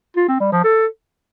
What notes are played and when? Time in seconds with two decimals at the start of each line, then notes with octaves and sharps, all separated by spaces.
0.17 F4
0.28 C4
0.40 G3
0.52 F3
0.64 A4